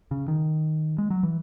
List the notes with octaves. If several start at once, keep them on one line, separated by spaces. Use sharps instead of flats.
C#3
D#3
G#3
F#3
E3